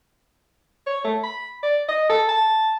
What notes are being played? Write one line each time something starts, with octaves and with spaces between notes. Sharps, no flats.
C#5
A3
B5
D5
D#5
A4
A5